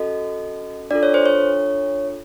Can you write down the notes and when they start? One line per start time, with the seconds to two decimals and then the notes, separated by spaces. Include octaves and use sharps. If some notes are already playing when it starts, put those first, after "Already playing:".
Already playing: C#4 F#4 A4 D#5
0.91 D4 F4 A4 D5
1.03 C#5
1.14 C5
1.26 C#5